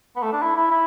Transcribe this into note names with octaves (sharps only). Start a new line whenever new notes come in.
B3
A3
D4
E4
E4
E4